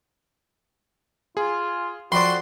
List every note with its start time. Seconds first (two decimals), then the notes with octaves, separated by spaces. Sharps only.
1.37 F4 G#4
2.12 F2 F#4 D5 B5 C6